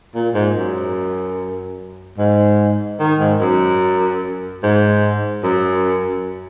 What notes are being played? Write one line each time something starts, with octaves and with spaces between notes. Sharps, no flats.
A#2
G#2
F#2
G#2
D#3
G#2
F#2
G#2
F#2